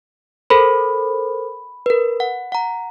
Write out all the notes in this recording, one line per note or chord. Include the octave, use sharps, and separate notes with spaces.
A4 A#4 C5 B5
A#4 B4
F#5
F#5 A#5